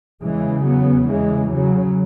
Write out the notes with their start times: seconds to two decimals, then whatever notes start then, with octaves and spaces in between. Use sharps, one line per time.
0.22 E2 C#3 E3 G#3
0.65 F#3 B3
1.08 E3 G#3
1.51 C#3 F#3